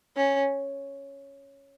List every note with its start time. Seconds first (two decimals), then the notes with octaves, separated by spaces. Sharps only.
0.17 C#4